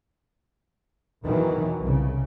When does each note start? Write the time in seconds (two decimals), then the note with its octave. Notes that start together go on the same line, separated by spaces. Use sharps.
1.23 E2 B2 D#3 E3 F#3
1.81 C2 C#3